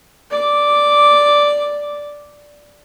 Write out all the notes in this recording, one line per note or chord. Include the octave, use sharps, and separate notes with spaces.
D5 D6